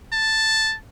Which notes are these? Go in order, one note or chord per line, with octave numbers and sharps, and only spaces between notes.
A5